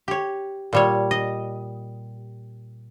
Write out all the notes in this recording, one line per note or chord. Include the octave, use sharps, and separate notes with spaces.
G4 C#5
A#2 G3 C#5
D#5